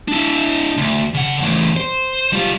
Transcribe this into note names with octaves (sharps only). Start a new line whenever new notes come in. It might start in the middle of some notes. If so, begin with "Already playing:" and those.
D4 E4
D2
C#3 F#5
E2 A2
C5
G3 F4